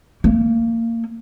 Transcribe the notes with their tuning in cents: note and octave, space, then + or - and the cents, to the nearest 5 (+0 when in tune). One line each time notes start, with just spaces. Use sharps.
A#3 -25